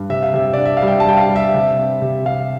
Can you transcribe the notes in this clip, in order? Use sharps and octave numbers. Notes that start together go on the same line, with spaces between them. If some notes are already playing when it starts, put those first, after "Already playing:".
Already playing: G2
C3 E5
F5
C3 E5
D4 D5
E5
F5
G3
G5
A5
G3 G5
F5
G3
E5
C3
C4
C3
C3 F5